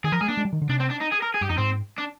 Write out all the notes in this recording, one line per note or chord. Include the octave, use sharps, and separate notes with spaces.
D#3 G#4
F3 A#4
G#3 G#4
A#3 D4
G#3
G3
D#3
D3
C3 D4
C4
D4
D#4
G#4
A#4
G#4
G2 G4
F2 D#4
G#2 C4
D4